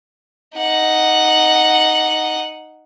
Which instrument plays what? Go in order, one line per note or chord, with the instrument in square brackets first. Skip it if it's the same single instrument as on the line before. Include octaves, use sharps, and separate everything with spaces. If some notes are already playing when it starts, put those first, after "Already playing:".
[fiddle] D#4 F#5